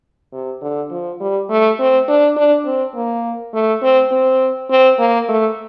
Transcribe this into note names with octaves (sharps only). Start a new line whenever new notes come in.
C3
D3
F3
G3
A3
C4
D4
D4
C4
A#3
A3
C4
C4
C4
A#3
A3